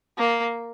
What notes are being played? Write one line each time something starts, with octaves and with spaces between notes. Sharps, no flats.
A#3